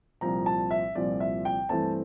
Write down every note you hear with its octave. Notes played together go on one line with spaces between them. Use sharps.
C2 A#2 F3 C4 A#5
A5
E5
C2 A#2 F3 C4 D5
E5
G5
G2 E3 A3 C4 A5